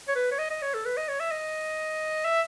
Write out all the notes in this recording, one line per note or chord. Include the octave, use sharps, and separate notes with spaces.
C#5
B4
C#5
D#5
D#5
C#5
A4
B4
D#5
C#5
E5
D#5
E5